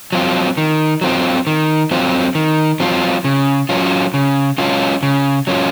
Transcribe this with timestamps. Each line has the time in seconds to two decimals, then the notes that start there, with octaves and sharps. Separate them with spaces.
0.12 F#3 C4 F4
0.57 D#3
1.01 F#3 C4 F4
1.47 D#3
1.91 F#3 C4 F4
2.35 D#3
2.80 F#3 C4 F4
3.24 C#3
3.69 F#3 C#4 F4
4.14 C#3
4.58 F#3 C#4 F4
5.03 C#3
5.47 F#3 C#4 F4